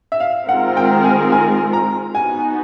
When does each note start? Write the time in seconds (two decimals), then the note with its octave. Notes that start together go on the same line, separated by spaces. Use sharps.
0.12 E5
0.20 F5
0.48 D#3 G#3 C4 F4 A#4 F#5
0.77 G5
1.04 G#5
1.32 G#5
1.73 A#5
2.15 B3 D#4 F#4 G#5